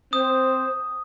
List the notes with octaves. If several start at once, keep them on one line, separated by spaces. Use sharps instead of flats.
C4 C5 D#6